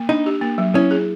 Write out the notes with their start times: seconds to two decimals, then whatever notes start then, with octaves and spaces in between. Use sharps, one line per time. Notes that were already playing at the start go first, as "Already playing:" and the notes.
Already playing: A#3
0.09 D4 D#4
0.26 G4
0.41 A#3
0.58 F#3
0.75 C#4 E4
0.91 G#4